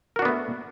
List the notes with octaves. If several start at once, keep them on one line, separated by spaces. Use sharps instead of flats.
A3 B3 D4 F#4 A#4